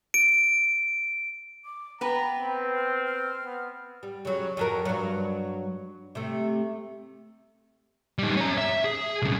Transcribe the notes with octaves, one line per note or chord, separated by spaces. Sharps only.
D7
D6
B3 B4 G5 A#5
C4
F6
F6
B3
G3
C#3 F#3
F2 F#3 A#4
G2 F#3
C3 A3
G3 D#4
C#4 A#5
E5
G#4
B1 C#3